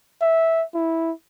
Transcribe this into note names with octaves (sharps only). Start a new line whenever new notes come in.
E5
E4